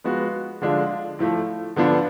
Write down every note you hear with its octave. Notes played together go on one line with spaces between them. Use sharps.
F3 G#3 B3 F#4
D3 F3 G#3 D4 F4
A2 F3 A3
D3 F3 B3 D4 F4